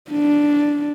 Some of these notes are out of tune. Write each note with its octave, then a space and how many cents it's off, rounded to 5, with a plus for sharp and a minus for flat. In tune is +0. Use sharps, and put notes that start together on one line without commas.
D4 -5